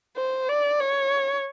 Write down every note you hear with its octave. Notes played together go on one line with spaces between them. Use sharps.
C5
D5
C#5